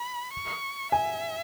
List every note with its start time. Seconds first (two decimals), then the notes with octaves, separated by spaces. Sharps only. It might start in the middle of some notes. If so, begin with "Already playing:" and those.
Already playing: B5
0.33 C#6
0.92 E5 G#5